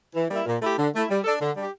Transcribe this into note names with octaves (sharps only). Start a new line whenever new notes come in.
E3
G3 A#3 E4
A#2
A3 E4 G4
D3
A3 E4
G3
D4 A4
D3
G3 D4 G4